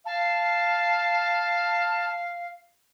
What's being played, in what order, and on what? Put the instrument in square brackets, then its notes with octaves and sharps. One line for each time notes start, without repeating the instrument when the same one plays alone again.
[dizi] F5 [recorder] A5